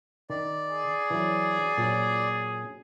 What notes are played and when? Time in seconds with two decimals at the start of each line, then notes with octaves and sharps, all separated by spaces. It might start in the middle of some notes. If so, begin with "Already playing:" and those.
0.30 D#3 D5
0.68 G#4
1.10 E3 F#3
1.77 A#2 F#3 G#5